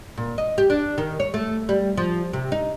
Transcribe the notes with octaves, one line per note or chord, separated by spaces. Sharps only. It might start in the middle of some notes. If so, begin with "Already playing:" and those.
A#2
D#5
G4
D4
D#3
C#5
A3
G3
F3
C3
D#4